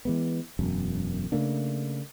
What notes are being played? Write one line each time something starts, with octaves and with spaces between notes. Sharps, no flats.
E3 G#3 B3
E1 F#2
C#3 A3 A#3 D4